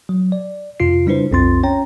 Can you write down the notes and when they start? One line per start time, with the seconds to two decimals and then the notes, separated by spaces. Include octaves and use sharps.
0.09 F#3
0.32 D5
0.80 F2 C3 F4 C7
1.06 C#3 G3 D4 E4 B4 C5
1.31 B1 F2 C4 F4 C6 A6
1.63 C#4 C#5 G5 A#5